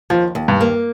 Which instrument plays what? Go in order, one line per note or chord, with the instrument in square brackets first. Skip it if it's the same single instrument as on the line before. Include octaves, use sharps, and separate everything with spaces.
[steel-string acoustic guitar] D#2 [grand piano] F3
[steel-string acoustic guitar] D#2
[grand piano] G2
[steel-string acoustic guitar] A#3